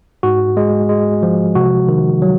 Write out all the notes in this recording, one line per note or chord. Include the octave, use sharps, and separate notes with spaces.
G#2 F#4
G#3
G#3
F3
C3 F#4
D#3
F#3